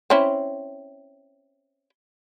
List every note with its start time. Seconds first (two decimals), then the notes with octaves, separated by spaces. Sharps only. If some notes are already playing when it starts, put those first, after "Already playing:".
0.10 C4 C#4 E4